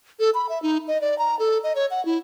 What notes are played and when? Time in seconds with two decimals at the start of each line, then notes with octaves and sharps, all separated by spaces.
0.20 A4
0.35 B5
0.49 E5
0.62 D#4
0.88 D#5
1.01 D5
1.19 A#5
1.39 A4
1.64 D#5
1.75 C#5
1.91 F#5
2.05 E4